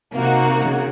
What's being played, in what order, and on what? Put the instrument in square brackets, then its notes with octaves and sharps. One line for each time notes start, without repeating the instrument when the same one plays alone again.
[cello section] C3 [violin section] A#3 D#4 F#4
[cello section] C#3